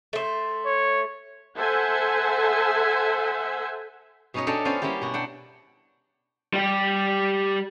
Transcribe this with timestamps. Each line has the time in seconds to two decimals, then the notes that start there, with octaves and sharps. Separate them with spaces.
0.13 A3 C5
0.66 C#5
1.57 A4 C5 E5 F#5 G#5
4.34 B2 C#4 D#4 C#5 D#5
4.47 C#4 D4 A4 C#5 D#5 G5
4.65 B3 C#4 F4 C5 D5 G#5
4.82 G3 A#3 C#4 E4 G4
5.01 B2 F#4
5.14 D4 F#5 G5
6.53 G3 G4